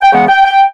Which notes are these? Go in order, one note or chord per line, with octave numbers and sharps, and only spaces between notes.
G5
C#3 E3 G#3 B3 F#5
G5
G5